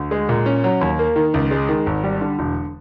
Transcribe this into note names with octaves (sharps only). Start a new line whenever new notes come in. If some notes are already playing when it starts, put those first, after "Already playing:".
Already playing: D2
G#3
A#2
C#4
F#3
D#2
A#3
D#3
C#2
G#3
D#3
G#1
G3
D3
E1